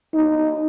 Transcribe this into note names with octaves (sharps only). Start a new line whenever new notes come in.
D#4